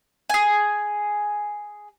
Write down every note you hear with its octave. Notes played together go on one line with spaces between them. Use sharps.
G#4 G#5